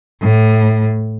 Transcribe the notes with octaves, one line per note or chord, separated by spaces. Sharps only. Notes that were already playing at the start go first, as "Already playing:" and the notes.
A2